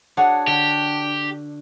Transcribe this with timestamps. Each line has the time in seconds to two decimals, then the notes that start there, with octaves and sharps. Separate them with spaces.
0.17 D4 F#4 G#4 C#5 F#5
0.47 D3 D4 G4